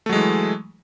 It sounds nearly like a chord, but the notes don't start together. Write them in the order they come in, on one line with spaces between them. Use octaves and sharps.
A3 F#3 G#3 E3